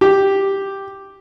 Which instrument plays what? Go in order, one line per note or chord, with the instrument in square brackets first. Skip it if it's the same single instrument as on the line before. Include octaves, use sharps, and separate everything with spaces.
[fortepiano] G4